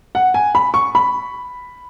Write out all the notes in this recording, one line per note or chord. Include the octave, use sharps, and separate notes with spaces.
F#5
G#5
B5
C#6
B5